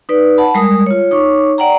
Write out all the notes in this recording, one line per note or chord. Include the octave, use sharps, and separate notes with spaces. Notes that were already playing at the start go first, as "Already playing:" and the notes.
D#4 B4 D5
F#5 A5 B5
G3 G#3 A#4 D#6
F4 C#5
D#4 C#5 C#6 D6
D5 F#5 G5 A#5